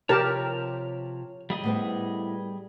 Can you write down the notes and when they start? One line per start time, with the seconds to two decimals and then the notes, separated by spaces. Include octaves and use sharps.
0.09 C3 F3 G4 A#4 C#5 A5 F6
1.50 G3 G#4 D#5
1.64 A2 B3 C4